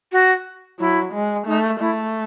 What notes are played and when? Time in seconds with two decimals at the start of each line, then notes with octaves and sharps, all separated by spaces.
0.12 F#4
0.79 F#3 E4
1.13 G#3
1.46 A3 D#4
1.80 A3 E4